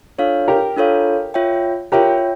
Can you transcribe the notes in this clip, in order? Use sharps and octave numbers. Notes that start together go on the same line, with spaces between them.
D4 F4 A4 C#5 F5
G4 A#4
D4 F4 A4 C#5 F5
F4 C#5 E5 G5
F4 G4 A#4 C#5 E5 G5